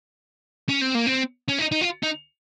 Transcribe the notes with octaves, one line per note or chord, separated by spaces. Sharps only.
C#4
C4
A#3
C4
C#4
D#4
D#4
F4
D#4